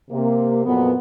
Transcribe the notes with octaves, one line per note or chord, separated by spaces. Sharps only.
C3 A#3
F2 A#2 F#3 B3